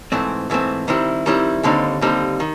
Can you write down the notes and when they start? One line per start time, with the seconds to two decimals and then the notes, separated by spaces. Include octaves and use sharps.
0.12 G#2 E3 A3 C4
0.50 G#2 E3 A3 C4
0.88 D#3 G3 C4 E4
1.26 D#3 G3 C4 E4
1.63 D#2 D3 G3 C4 D#4
2.01 D#2 D3 G3 C4 D#4
2.40 D#3